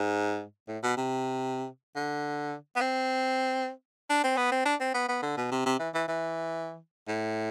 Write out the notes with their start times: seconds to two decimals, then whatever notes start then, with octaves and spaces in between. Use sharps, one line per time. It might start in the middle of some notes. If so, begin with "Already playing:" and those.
Already playing: G#2
0.68 A2
0.83 B2
0.97 C3
1.96 D3
2.76 B3
2.81 C4
4.10 D4
4.24 C4
4.37 B3
4.52 C4
4.65 D4
4.81 C4
4.94 B3
5.09 B3
5.22 D3
5.37 B2
5.51 C3
5.66 C3
5.79 E3
5.94 E3
6.08 E3
7.08 A2